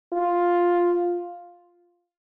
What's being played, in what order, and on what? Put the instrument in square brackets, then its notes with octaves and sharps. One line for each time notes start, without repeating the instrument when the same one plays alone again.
[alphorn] F4